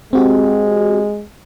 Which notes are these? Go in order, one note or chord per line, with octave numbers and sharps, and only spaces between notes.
G#3 C4 F#4 G4